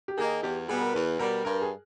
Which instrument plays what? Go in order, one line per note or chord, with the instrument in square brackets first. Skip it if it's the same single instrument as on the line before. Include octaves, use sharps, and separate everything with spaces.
[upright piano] G4
[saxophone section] D#3 A#3 D#4 [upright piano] G#4
[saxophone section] E2 [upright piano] G4
[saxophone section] B2 G3 B3 [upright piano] G#4
[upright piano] A#4
[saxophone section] E2 [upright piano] B4
[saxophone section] B2 G3 [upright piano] A#4
[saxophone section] G2 [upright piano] A#4
[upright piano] G#4